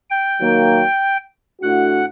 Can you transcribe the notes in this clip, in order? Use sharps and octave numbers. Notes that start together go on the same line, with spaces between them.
G5
D#3 F#3 A#3
A2 A3 D4 F#4 F#5